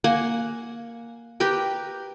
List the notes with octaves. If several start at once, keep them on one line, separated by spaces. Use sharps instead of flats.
A#3 F#5 G#5
G4 A#4 B4 G5